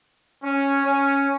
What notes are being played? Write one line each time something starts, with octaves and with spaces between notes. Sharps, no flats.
C#4
C#4